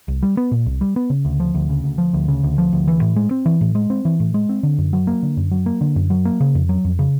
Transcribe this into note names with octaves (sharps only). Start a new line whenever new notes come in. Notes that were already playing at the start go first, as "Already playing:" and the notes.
C2
G3
B3
A#2
C2
G3
B3
C#3
D2
F3
D2
C#3
D2
F3
D2
C#3
D2
F3
D2
E3
A2
G#3
C4
E3
A2
G#3
C4
E3
A2
G#3
C4
D3
F#2
F#3
A#3
D3
F#2
F#3
A#3
D3
F#2
F#3
A#3
C#3
F2
F#3
F2
C#3